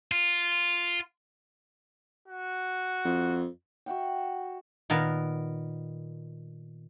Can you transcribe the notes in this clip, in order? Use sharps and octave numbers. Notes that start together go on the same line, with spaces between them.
F4
F#4
F2
F#4 E5 F#5 G5
A#2 D#3 B3 A#4